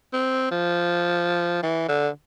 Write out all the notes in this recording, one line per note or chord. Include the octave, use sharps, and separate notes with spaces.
C4
F3
E3
D3